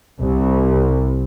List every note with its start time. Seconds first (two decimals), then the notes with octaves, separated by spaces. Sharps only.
0.20 C2